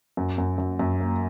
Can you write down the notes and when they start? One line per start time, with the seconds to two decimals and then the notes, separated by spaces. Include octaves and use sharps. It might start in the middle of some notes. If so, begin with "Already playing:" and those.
0.17 F#2
0.38 F#2
0.58 F#2
0.79 F#2
1.00 A#3